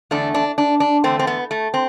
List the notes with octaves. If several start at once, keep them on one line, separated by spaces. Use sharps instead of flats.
E2 D3 A3 D4
D4
D4
D4
E2 D3 A3 C4
C4
B3
A3
C4